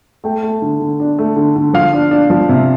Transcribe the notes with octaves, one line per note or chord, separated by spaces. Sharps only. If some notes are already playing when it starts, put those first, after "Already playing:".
A3 G5
A3
D3
D3
D4
A3
D3
D3
F3 F5
D4
D4
F3
C3